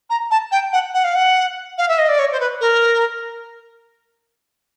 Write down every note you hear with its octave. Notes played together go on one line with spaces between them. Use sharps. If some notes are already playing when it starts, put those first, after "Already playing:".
A#5
A5
G5
F#5
F#5
F5
F#5
F5
E5
D#5
D5
C#5
C5
B4
A#4